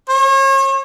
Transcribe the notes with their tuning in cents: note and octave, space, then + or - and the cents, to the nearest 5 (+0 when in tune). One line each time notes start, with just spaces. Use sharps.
C#5 -40